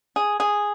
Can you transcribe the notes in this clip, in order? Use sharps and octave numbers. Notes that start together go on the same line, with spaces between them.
G#4
G#4